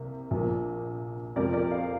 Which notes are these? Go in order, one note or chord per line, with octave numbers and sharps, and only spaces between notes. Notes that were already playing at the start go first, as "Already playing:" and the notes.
Already playing: C2 C3 A#3
A#1 A#2 F3 A#3
F2 C3 F3 A#4 D5
A#4 D5
D5 F5